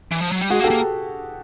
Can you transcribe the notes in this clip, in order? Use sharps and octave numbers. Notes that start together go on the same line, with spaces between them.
E3
F3
F#3
G3
G#3 F#4 G#4
A#3
G4 A4
A#3